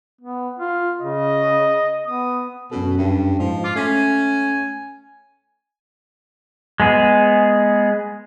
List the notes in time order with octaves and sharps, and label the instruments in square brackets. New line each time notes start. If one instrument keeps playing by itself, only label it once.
[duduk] B3
F4
[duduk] C#3 [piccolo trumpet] D#5
[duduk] B3 [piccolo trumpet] D#6
[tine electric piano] F#2 C#4 A4 [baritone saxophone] B2
[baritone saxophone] G2
[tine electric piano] G#2 [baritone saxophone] F3
[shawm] F4 [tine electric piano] D6 C7
[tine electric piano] A3 B6 [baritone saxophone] C#4 [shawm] G#5
[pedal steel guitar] G#3 B3 G#4